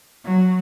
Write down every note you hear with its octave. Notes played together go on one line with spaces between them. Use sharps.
F#3